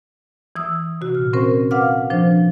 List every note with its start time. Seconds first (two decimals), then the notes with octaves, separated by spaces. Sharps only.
0.56 E3 D#6 E6
1.01 C3 F#4
1.15 A#2 F6
1.33 C4 C#4 A#4 C5
1.71 B4 F5 F#5 D6 F6
2.10 F3 D4 C5